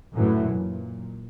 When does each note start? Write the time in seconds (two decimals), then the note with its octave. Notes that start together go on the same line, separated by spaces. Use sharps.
0.15 F#2 A2 D3 E3 F#3
0.50 A#2